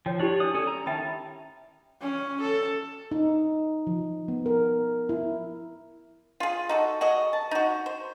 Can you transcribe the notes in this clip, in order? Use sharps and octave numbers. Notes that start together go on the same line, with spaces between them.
F3 C#5 G5
D4 E4 G4 C#5 A5
D4 D5 D#6
C#4 A4 G#5
A#5
D#3 C#4 E5 G5 A5 B5
C#4
A4
D#4
F3
B3
A#4
E4
F4 G#4
D#4 F#4 A4
F#4 G#4 D#5
A5
D#4 F#4
C5